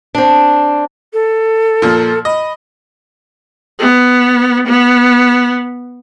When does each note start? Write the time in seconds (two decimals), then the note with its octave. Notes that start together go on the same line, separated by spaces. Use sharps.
0.15 C4 D4
1.12 A4
1.82 A#2 F3
2.25 D#5 B5
3.79 B3
4.67 B3